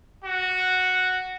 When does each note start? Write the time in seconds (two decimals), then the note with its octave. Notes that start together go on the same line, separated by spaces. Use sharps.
0.24 F#4